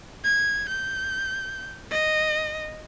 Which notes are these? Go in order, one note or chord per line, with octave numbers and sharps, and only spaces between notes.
G#6
G6
D#5